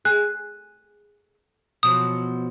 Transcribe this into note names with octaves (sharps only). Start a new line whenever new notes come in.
G#4 F#6
B2 F3 F#3 D#6